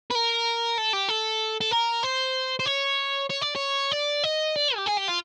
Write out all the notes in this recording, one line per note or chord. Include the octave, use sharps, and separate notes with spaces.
B4
A#4
A4
G4
A4
A4
A#4
C5
C5
C#5
C#5
D5
C#5
D5
D#5
D5
G4
G#4
G4
F4